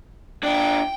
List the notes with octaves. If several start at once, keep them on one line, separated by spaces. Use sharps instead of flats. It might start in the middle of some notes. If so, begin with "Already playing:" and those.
D4 F4 G5